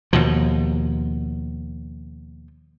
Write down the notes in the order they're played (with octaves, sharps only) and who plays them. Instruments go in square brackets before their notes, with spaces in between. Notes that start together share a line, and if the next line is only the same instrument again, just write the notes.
[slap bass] D#2 B2 F3